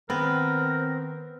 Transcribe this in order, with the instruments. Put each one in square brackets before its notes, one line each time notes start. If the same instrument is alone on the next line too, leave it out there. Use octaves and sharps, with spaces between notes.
[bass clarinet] D#3 [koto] B3 [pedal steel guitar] C4 [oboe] A#4